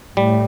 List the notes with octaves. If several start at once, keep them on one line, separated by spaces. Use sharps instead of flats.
A2 G3